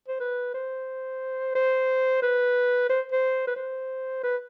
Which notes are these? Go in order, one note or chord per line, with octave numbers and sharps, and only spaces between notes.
C5
B4
C5
C5
B4
C5
C5
B4
C5
B4